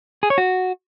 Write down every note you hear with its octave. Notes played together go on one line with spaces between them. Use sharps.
G#4
C#5
F#4